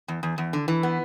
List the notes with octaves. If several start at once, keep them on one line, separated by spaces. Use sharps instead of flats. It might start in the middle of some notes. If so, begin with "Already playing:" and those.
E2
E2
E2
D3
E3
B3